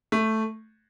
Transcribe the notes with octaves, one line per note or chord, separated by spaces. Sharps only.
A3